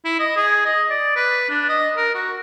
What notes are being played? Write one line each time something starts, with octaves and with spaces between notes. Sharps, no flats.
E4
D#5
G#4
D#5
D5
B4
D4
D#5
A#4
F#4